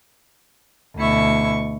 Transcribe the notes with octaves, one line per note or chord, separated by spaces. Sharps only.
D2 B2 E4 C#6